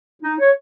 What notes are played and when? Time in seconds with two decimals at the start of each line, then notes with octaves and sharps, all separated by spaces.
0.23 D#4
0.39 C#5